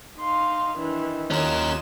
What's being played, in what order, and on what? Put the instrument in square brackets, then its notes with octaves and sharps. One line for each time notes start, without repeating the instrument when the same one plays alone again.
[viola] D#4 F5 [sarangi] C6
[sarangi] D#3 [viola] E3 D4
[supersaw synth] D#2 E7 [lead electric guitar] C#4 A#4 [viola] F4 D#5